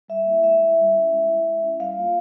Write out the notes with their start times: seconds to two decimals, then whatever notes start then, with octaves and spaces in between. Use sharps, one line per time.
0.08 G3 E5
0.26 A#3 E4
0.43 G#3 E5
0.60 E4
0.77 G3
0.94 C#4 E4
1.11 G#3
1.28 E4
1.46 G#3
1.63 C#4 E4
1.79 G3 F5
1.97 A#3 F4